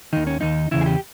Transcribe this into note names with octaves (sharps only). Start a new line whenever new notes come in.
D#2 D#3 D#4
C#4
D#2 D#3 D#4
E2 C#3 E3 E4
G#4
G4